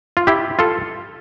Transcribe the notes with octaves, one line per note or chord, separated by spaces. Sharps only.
F4
E4 G4
F4 A4